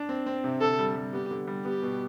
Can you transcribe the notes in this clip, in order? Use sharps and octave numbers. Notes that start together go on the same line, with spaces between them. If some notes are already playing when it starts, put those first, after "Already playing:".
Already playing: D4
C4
C4
C3
D3 A4
G3
G3
B3 G4
D3
G3
B3 G4
B2